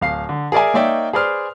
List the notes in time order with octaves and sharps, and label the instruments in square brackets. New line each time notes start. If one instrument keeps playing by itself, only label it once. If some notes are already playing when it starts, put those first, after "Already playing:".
[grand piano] D1 F5 C7
D3
G#4 A#4 D5 E5 G#5
A#3 D#4 C#5 D5 E5 G5
G#4 B4 C5 D5 C6 F6